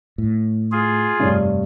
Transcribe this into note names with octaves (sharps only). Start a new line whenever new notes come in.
A2
F4 G#4
F1 G2 C#5